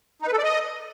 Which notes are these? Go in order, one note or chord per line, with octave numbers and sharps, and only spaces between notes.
D#4
B4
A4
D5
D#5